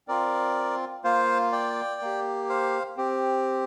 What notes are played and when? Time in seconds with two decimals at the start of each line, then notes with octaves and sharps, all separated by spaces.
0.08 C4 F4 A#4 D5
1.04 A#3 F4 C5 F5
1.52 D5 G5
2.01 A#3 G4
2.49 C5 F5
2.97 C4 G4